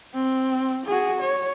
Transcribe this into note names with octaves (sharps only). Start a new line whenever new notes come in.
C4
F#4 G#4
C#5